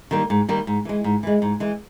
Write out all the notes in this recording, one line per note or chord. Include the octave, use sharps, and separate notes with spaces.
D#3 G3 A#3
G#2
D#3 G3 A#3
G#2
E3 G#3
G#2
E3 G#3
G#2
E3 G#3